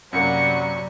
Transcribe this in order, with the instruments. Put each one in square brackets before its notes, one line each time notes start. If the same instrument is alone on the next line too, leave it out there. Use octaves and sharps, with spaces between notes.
[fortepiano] F#2 A#3 [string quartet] C3 F#3 G3 [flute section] F#5 [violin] C#6